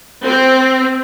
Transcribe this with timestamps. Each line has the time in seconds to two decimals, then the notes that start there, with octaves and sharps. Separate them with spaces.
0.25 C4